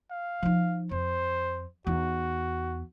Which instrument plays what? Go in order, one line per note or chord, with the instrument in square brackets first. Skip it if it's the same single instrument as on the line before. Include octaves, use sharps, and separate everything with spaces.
[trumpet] F5
[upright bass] F3 D#4
[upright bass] F2 [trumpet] C5
[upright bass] E2 D#4 [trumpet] F#4